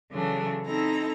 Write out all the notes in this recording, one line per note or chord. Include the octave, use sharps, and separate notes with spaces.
C#3 E3 F#3 A3 D4
C4 D#4 E4 A4 A#5